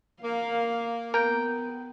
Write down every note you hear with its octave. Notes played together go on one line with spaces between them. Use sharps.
A#3 F5
B3 A#4 G5